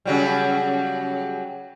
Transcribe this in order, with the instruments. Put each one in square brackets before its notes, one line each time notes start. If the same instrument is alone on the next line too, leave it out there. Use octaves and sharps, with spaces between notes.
[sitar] C#3 F#3 G3